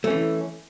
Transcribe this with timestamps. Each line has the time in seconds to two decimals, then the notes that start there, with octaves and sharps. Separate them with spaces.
0.04 A3
0.07 C#4
0.10 E3